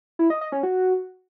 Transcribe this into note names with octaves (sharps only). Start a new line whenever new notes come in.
E4
D#5
D#5
C#4
F#4